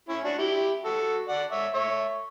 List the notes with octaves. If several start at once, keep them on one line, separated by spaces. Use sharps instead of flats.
C#4 E4
D4 F#4
E4 G4
F#4 A4
D5 F#5
C#5 E5
C#5 E5